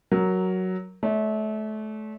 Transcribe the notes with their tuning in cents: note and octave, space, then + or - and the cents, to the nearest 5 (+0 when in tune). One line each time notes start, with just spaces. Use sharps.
F#3 +5 A#4 +0
A3 -30 D5 -45